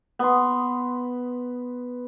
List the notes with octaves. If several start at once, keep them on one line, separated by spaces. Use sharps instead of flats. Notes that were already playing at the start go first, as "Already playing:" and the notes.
B3 C6